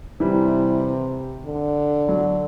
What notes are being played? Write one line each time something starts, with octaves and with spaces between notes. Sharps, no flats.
C3 E3 G3
D3
F#3